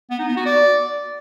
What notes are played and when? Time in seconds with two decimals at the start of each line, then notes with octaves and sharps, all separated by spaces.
0.11 B3
0.19 D#4
0.28 B3
0.37 F#4
0.46 D5